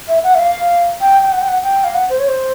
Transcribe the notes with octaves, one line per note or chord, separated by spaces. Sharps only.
E5
F#5
E5
F5
G5
G5
F#5
G5
F#5
G5
F5
F#5
C5
C#5
C5